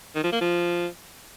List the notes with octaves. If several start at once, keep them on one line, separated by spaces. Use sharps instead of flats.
D#3
F3
A#3
F3